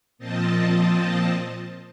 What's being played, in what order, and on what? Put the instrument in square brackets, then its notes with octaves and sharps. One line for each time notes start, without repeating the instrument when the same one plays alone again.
[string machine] A#2 F3 C4 D#5 A5